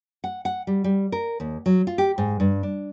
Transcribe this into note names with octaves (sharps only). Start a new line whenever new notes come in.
F#5
F#5
G3
G3
A#4
D#2
F#3
F4
G4
G#2
G2
D4